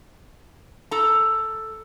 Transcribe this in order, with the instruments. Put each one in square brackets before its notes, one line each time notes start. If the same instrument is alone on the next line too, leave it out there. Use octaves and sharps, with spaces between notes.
[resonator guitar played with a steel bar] A4 A#5